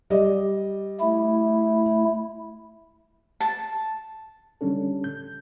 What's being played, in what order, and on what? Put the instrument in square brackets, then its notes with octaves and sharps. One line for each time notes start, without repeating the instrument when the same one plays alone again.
[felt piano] G3 D5 D#5
[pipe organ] A3 E4
[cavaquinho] A5
[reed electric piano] D3 G3 C#4 D4 A4
G6